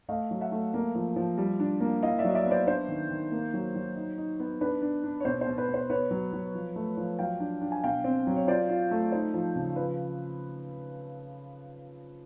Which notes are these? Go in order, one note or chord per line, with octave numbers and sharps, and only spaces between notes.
A3 D#5 F5
F#3
E5 F#5
A3
A#3
F3
F3
G3
D4
A#3
E4 D#5 F5
D5 E5
F#3 D#5
D5 E5
B3
C5 D5
D4 C5
D#3
D#3
A#3
F#3
F#3
D#4
D#4
B3
D4 B4
D4
D4
C#5
B2 C5
C5
B2
B4
B2
C5
B3 B4 C#5
F#3
F#3
F3
A3
F3
F#3 F5 G5
D4
D4
G#5
B2 F5 G5
C4
F#3
C#5
F4 C5 D5
F4
A3
D#4 C5
F3
C#3
F3 B4